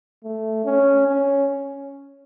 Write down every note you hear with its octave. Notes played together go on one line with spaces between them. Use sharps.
A3
C#4
C#4